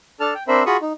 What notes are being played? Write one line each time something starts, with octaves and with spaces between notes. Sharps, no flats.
D4 A4 A5 F6
G5
C4 D4 A#4 C5 E5 B5
F4 F#4 G#4 B5 C#6 D#6
D#4